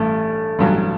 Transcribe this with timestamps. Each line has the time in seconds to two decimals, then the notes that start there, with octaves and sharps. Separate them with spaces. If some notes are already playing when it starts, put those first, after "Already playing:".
Already playing: A1 G2 A3
0.59 A1 G2 F#3